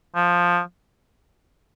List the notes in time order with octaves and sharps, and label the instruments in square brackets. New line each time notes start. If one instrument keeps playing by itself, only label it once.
[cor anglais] F3